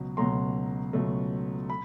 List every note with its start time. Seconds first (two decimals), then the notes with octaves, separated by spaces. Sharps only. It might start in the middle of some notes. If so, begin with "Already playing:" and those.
Already playing: C#2 B2 F#3
0.17 C#2 B2 F#3 A3 A#5 C6
0.93 C#2 B2 F#3 A3
1.70 B5